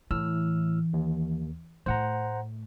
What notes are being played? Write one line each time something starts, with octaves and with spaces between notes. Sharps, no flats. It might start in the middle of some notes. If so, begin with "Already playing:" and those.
A2 E3 E6 F6
D#2
A2 A3 C5 F#5 A#5